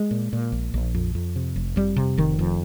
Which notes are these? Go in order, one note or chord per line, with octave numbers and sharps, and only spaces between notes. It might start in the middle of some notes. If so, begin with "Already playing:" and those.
Already playing: G#3
A#2
A#2
A#1
A#1
F2
F2
C3
F1
F2 G3
C3
F1 D#3
F2